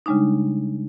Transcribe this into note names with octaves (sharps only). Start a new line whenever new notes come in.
C#3 G3 G#3 D4 D#4